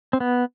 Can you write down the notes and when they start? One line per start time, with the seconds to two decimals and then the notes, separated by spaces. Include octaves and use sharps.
0.13 C4
0.20 B3